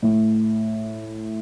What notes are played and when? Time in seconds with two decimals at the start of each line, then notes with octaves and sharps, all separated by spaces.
0.02 A2